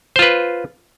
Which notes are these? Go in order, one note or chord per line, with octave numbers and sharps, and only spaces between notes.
F4 B4 C5